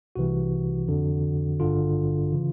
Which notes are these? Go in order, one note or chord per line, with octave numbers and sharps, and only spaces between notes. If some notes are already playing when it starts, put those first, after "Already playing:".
C2 C3 E3 F#4
F2 D3
G#1 G2 D3 F4
C#3 E3